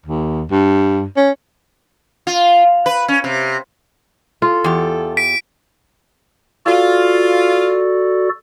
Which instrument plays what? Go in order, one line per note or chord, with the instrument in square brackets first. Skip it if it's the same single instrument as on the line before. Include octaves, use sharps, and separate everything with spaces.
[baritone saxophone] D#2
G2
C#4
[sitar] F4
B4
C#4
C3
[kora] F4 [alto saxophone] A4
[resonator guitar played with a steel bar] E2 G4
[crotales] B6 D7
[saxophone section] F4 [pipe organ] F#4 A4 D5